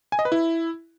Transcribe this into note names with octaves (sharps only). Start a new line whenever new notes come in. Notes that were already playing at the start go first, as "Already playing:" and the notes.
G#5
D#5
B4
E4